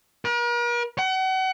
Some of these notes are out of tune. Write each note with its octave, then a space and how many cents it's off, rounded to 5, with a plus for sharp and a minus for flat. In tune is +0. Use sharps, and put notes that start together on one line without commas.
A#4 +45
F#5 +35